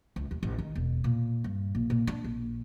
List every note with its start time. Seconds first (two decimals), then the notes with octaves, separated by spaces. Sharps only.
0.16 C#2
0.31 D#2
0.43 A1
0.59 D#3
0.75 E1
1.04 A#2
1.44 G2
1.75 A#1
1.90 A#2
2.07 D4
2.24 A#1